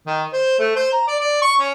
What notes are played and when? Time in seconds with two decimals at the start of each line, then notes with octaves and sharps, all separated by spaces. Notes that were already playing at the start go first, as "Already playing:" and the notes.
0.07 D#3
0.33 C5
0.59 A3
0.76 C5
0.93 A#5
1.07 D5
1.20 D5
1.42 C#6
1.59 C#4